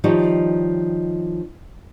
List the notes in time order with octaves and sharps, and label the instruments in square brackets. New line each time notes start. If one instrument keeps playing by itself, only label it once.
[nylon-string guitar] D#3 F3 G3 D#4 E4 C#5